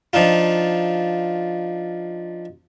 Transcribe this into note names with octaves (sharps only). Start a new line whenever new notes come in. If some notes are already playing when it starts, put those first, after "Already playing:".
F3 D4 D#4 F4